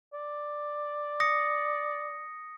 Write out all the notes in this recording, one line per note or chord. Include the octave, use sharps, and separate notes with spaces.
D5
D#6 A#6 C#7